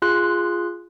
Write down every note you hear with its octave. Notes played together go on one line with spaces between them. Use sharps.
F4 G#4 C6 F#6